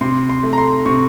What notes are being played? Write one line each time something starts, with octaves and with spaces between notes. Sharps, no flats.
C3 C6
C6
A3
A#5
C6
C3 C#6